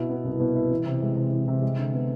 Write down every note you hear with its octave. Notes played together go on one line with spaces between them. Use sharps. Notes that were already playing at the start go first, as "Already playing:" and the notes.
Already playing: B2 E4
B3
C2
B2
E4
E3
C3
G#3
C3
E3
C3
G#3
D3
B3